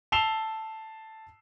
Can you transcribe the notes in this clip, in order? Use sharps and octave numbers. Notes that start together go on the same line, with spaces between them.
A5 E6 C7 E7 F7 G7